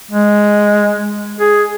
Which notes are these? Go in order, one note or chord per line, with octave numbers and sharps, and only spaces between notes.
G#3
G#4